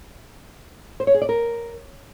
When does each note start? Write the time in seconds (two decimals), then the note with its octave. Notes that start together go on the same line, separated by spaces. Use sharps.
1.00 C5
1.07 C#5
1.14 G#4
1.22 D5
1.29 A#4